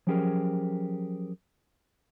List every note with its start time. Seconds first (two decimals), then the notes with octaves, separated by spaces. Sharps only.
0.07 F3 F#3 C#4 G4 G#4 A#4